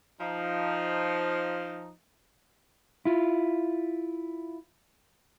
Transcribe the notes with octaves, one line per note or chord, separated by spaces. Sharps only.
F3 D#4
E4 F4